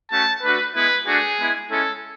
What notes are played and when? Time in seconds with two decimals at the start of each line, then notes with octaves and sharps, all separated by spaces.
0.11 A3 C#4 F#4 A5
0.42 A3 D4 F#4 B4
0.75 G#3 B3 E4 B4
1.06 A3 D4 F#4 G#4
1.38 G#3 B3 E4
1.70 G#3 C#4 E4 A4